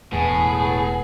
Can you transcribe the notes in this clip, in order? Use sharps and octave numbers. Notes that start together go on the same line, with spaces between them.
E1 A2 B3 G#4